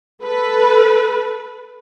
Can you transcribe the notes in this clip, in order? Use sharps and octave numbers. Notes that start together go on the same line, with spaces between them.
A4 B4